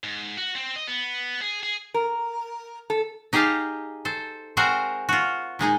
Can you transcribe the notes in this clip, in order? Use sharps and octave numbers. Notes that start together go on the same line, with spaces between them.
G#2
F#4
C4
D#5
B3
G#4
G#4
A#4
A4
D#4 G4 G#4 D#5 F5 A5
A4 C5
G#3 C4 F#4 A#4 C5 A#5
F4 F#4
A#2 G#3 D#4 G#4